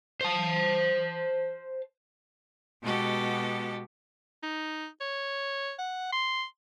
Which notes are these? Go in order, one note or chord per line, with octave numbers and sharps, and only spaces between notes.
C5 A5
B2 G#3 B3 F#4 G4 A4
D#4
C#5
F#5
C6